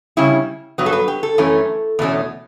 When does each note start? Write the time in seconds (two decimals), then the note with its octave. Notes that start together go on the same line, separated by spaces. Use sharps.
0.17 C#3 G3 C#4 E4
0.78 G2 F#3 B3
0.86 A4
0.93 B4
1.08 G4
1.23 A4
1.38 F#2 E3 A3 C#4
1.99 E2 B2 A3 C#4